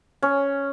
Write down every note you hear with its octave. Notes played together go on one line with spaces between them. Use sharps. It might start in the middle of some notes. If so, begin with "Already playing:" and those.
C#4